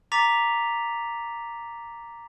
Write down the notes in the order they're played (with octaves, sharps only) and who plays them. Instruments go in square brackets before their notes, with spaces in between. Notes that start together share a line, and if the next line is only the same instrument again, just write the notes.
[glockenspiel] A#5 D6 A6 B6 F7